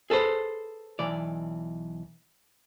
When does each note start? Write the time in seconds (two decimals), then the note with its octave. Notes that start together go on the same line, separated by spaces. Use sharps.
0.10 G#4 A4 B4 C5
0.99 B1 E3 D5